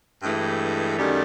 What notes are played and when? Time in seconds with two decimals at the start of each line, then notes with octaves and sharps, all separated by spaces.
0.22 G2 E3 G#3 A3
0.97 F#2 D#3 G3